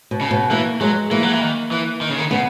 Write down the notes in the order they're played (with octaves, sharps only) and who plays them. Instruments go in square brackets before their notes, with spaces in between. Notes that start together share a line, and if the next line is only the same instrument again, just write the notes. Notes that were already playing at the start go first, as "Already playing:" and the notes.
[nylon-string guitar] B2
[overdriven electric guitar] C#3
[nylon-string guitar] B2
[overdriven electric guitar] E3 [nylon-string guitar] A#3
[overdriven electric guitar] F#3 [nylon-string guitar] G#3
[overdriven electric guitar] E3 [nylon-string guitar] A#3
[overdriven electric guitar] F#3
E3
D#3
E3
D#3
C#3
D#3
[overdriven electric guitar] C#3 [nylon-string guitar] B3